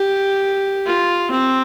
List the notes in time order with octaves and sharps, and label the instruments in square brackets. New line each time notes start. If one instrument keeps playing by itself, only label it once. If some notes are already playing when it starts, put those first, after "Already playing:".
Already playing: [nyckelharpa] G4
F4
C4